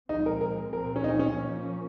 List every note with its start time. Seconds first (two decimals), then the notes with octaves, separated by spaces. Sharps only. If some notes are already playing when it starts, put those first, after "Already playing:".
0.09 A#2 F3 G#3 C4 D#4
0.26 A#4
0.41 A#4
0.72 A#2 F3 C4 A#4
0.96 C#4
1.04 D#4
1.19 C#4
1.35 F3 A#3 C#4